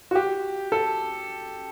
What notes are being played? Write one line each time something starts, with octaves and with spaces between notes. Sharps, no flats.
F#4
G4
A4